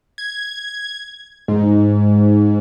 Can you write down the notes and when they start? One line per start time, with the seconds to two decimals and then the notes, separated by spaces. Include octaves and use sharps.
0.18 G#6
1.48 G#2